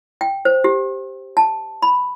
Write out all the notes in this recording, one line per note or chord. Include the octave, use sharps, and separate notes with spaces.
G5
C5
G4
A5
B5